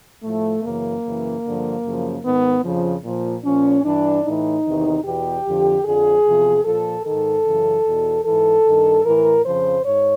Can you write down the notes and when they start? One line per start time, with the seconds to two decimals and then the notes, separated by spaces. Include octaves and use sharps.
0.23 A2 F3 A3
0.64 F#2 C#3 E3 A#3
1.03 F#2 C#3 E3
1.44 G2 D3 F3
1.84 F#2 C#3 F3
2.24 G#2 D#3 B3
2.64 F2 C#3 F3
3.04 A#2 F3
3.44 A#2 F3 C#4
3.84 G2 E3 D4
4.24 A2 E3 D#4
4.65 E2 C3 D#3
5.04 E2 B2 G4
5.45 F2 D3 F3
5.85 F2 D3 F3 G#4
6.25 E2 C3 F3
6.65 A#2 F3 A4
7.05 G#2 D#3 A4
7.45 F#2 C#3 E3
7.85 E2 B2
8.25 G#2 E3 A4
8.66 G2 D#3
9.05 A2 E3 A#4
9.45 F2 C#3 F3 C5
9.86 G#2 C#5